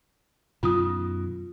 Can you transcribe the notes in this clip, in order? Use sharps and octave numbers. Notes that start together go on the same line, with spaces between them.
F#2 B2 D#3 F4 D#6